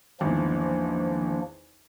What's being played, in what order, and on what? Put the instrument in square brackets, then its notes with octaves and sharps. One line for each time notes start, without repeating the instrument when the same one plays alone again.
[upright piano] G#1 E2 [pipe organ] F3 A#3 D4